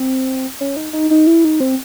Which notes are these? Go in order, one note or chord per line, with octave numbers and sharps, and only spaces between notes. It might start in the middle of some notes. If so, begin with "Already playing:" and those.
Already playing: C4
C#4
D#4
D#4
D#4
E4
D#4
C4